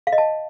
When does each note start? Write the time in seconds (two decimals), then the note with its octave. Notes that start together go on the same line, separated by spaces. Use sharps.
0.07 F5
0.12 D#5
0.18 A5